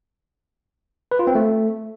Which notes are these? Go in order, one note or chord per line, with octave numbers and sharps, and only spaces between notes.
B4
F4
C4
A3